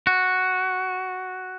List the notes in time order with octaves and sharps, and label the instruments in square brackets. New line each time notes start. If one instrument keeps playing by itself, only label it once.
[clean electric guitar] F#4